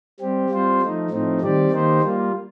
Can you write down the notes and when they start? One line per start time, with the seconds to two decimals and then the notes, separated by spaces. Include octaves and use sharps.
0.20 G3 C4 G4
0.50 G3 C4 F4 C5
0.81 F3 A3 D#4
1.10 A2 F3 A3 C4 D#4
1.41 D#3 G3 C4 G4 D5
1.71 D#3 A#3 D#4 G4 C5
2.02 G3 A#3 F4